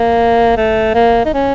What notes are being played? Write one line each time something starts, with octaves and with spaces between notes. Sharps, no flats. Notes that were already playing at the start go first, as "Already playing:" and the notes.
Already playing: A#3
A3
A#3
D#4
C#4